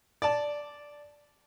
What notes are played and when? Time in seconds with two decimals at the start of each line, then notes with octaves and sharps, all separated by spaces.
0.22 D5 A5